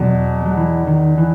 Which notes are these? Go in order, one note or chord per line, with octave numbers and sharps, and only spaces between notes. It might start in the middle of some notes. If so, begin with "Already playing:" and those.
Already playing: E2 B2 F#3
F#3
E3
D#3
E3